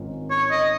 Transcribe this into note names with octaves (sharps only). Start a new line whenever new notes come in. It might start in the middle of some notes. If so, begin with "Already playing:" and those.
Already playing: G#1 G#2 D#3 C#4 F4
C#5
D#5